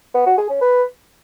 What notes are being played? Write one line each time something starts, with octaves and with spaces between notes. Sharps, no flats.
B3
F#4
G#4
C#4
B4